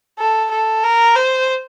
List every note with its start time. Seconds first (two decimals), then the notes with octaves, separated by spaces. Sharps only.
0.19 A4
0.51 A4
0.84 A#4
1.16 C5